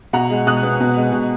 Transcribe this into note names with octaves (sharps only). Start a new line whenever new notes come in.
B2 F#5 A#5
G#3
B2 D#6 F#6
B3
B2
G#3
B2